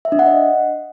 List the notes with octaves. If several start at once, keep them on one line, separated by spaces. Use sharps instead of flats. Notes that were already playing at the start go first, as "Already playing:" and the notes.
E5
D4
F#5
D#5